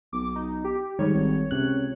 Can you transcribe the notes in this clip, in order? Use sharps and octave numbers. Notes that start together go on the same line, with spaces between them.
B1 D6
D#4
G4
G#2 D#3 G3 C#5
G#1
C#2 C3 F#6